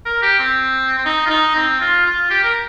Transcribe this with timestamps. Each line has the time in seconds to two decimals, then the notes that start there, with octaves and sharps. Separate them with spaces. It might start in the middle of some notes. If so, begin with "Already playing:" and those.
0.06 A#4
0.23 G4
0.39 C4
0.98 C4
1.05 D#4
1.26 F4
1.30 D#4
1.56 C4
1.81 F4
2.06 F4
2.30 G4
2.43 A#4